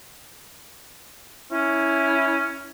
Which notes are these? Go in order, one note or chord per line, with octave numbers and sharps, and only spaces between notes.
C#4 E4